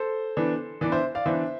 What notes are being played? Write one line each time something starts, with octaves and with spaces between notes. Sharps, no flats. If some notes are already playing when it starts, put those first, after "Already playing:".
Already playing: A4 C5
E3 B3 D4
E3 B3 D4 B4 D5
C5 E5
D5 F5
E3 B3 D4 C5 E5